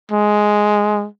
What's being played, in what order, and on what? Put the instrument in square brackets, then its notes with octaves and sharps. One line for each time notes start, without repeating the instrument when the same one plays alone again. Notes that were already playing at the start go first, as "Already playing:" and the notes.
[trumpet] G#3